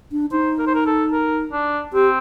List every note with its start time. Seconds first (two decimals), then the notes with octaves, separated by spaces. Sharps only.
0.12 D4
0.31 D#4 C5
0.59 A#4
0.67 C5
0.75 A#4
0.86 A4
1.13 A#4
1.52 D4
1.93 C4 G4